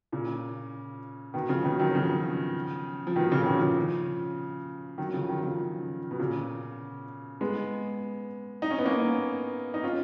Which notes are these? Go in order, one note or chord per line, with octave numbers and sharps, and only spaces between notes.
A#2 C#3
B2 D#3
C#3 F3
B2 D#3
D#3 F#3
F#3
C#3 F3
F3
B2 D#3
A#2 C#3
C#3
B2 D#3
C#3 F3
D#3 F#3
D#3
C#3 F3
D#3 F#3
C#3 F3
B2
A#2 C#3
G#3 B3
D#4
C#4
B3
A#3 C#4
D#4
C#4 F4